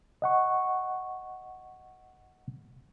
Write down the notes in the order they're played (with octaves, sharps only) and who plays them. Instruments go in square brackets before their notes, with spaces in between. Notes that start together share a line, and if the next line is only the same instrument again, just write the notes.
[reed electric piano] D#5 F#5 C#6